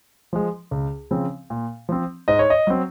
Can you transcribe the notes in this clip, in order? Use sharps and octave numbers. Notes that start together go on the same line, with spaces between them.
F3 G#3
C#2
C#3 F3 C4
A#2
F3 C4
G#2 D#5
C#5
D#5
F#3 C4